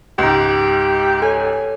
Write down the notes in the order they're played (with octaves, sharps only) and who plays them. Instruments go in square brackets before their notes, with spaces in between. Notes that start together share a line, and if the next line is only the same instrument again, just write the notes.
[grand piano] C#2 G#2 [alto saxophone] G4
[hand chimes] A4 C#5 [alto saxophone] G#5